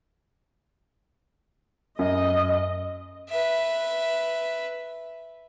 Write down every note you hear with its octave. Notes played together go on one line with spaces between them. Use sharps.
F#2 D#5
B4 E5